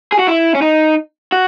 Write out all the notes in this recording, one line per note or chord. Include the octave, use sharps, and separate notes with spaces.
G#4
F#4
E4
C#4
D#4
F#4